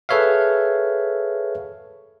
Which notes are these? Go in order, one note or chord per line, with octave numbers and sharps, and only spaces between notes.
G#4 A4 B4 C#5 E5 F5